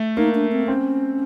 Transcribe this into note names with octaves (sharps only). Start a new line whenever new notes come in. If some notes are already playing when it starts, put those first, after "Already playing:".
Already playing: A3
A#3 D#4
D4
C4
C4 C#4